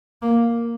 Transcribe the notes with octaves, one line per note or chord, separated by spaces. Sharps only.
A#3